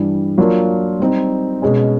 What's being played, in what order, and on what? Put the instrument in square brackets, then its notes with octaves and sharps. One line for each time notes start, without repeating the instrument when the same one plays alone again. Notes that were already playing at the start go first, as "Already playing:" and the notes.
Already playing: [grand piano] G2 E3 G3
F#3 A#3 D4 F4 A#4
G3 C4 D#4
B2 G#3 C#4